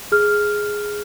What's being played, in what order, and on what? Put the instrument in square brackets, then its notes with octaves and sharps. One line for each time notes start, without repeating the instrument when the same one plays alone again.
[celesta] G#4 F6